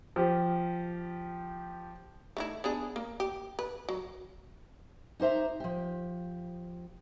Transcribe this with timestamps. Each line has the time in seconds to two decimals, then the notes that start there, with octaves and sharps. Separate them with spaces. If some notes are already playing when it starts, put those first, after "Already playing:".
0.16 F3 G4
2.37 A3 D#4 E4
2.64 B3 D4 G#4
2.96 A#3
3.20 G4
3.59 B4
3.89 F#3
5.20 D#4 G4 C5 E5 A#5
5.60 F3 G4